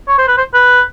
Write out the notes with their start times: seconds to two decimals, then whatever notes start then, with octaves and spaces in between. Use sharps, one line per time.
0.08 C#5
0.18 C5
0.28 B4
0.38 C5
0.54 B4